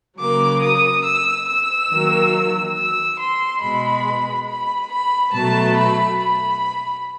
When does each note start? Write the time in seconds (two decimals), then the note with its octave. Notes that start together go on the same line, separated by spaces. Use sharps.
0.19 C#3 F#3 A#3 D6
0.62 D#6
1.05 E6
1.48 E6
1.91 D#3 F#3 A#3
2.76 E6
3.19 C6
3.62 B2 G#3 B5
4.49 B5
4.91 B5
5.34 B2 F#3 A3 A5
5.77 B5
6.20 B5